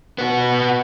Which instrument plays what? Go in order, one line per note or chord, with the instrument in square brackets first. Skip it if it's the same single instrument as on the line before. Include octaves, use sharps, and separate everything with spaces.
[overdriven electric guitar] B3 F#4